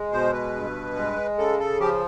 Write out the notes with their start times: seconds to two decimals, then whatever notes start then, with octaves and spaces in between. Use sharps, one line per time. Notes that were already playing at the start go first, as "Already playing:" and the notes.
Already playing: G#3
0.12 B2 C5
0.33 B4
0.55 G2
0.96 G#3
1.38 C#3 A4
1.59 A4
1.80 F3 G4